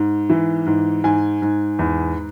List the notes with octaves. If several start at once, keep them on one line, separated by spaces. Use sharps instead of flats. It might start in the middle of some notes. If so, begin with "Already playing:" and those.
Already playing: G#2
E3
G#2
G#2 G#5
G#2
E2